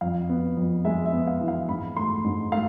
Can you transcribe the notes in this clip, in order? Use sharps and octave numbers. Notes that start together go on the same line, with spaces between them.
F2 F5
B3
F2
G#3 E5
E5
B3
F5
E3
F5
G#2 B5
A3 C6
G#2
A3 F5